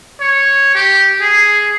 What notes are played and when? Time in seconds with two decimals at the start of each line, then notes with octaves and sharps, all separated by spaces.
0.20 C#5
0.75 G4
1.21 G#4